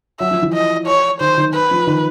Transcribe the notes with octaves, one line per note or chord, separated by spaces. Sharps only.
F#3 E5
F3
E3
D#5
C#5
D#3 C5
D#3
B4
F3
D#3